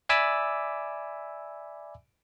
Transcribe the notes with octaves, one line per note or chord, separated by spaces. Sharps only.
D5 E5 G#5 B5 D6 E6